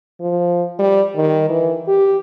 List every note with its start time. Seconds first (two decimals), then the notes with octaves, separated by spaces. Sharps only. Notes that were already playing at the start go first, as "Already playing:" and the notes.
0.20 F3
0.79 G3
1.16 D#3
1.49 E3
1.88 G4